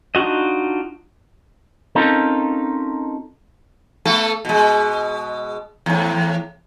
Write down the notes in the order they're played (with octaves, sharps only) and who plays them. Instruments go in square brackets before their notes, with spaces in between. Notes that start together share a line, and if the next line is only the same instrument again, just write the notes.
[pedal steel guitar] D4 D#4 F4 F#4 D#5
[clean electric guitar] C4 C#4 D#4 F4 A4 A#4
[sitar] A3 B3 A4
B2 G#3
E2 A2